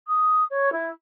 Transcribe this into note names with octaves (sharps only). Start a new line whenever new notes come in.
D#6
C#5
E4